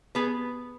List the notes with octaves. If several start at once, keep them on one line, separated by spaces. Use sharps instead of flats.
B3 G#4 B4